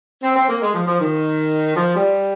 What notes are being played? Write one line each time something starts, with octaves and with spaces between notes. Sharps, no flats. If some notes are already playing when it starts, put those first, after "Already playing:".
C4
C4
A#3
G#3
F3
F3
D#3
F3
G3